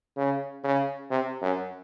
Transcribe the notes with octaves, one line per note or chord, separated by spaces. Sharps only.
C#3
C#3
C3
F#2